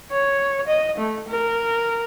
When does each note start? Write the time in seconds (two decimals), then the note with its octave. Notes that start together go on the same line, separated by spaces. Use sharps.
0.12 C#5
0.67 D#5
0.98 A3
1.29 A#4